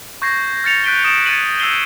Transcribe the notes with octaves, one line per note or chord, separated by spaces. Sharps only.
C#6 G6 G#6 A#6 C7
F6 A6 C#7 F7
F#6 G6 B6 D7 D#7 G7
D#6 A6 D7 E7 F7
F#6 G#6 A6 C#7 D#7 F#7
E6 G6 G#6 C7 F7 G7